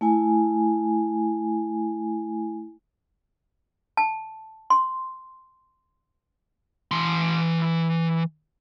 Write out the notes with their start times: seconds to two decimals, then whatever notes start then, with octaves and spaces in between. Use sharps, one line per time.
0.01 A3 E4 G#5
3.97 A5
4.70 C6
6.91 E3 C6